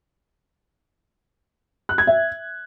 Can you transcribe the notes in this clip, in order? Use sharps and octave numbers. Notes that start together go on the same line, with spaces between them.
F#6
G#6
E5